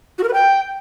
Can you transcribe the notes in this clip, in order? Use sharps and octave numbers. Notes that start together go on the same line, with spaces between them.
F#4
A#4
B4
G5